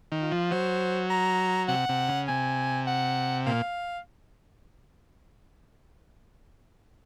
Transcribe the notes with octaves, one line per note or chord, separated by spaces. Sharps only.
D#3
F4
F3
F#3 C5
A#5
C3 F#5
C3
C#3
C3 G#5
F#5
A#2 F5